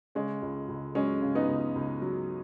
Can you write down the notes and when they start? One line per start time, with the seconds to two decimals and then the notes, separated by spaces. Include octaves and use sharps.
0.15 C#3 G#3 C#4
0.42 C#2
0.69 C#2
0.95 F#3 G#3 C#4
1.22 C#3
1.35 B3 D#4
1.49 C#2
1.75 C#2
2.02 F#3